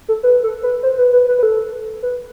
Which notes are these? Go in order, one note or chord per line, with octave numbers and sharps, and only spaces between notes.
A4
B4
A4
B4
C5
B4
B4
B4
B4
A4
B4